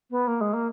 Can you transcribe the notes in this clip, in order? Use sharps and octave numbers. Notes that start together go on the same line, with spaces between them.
B3
A#3
G#3
A#3